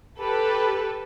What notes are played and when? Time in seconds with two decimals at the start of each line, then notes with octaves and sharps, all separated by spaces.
0.19 G4 A4 B4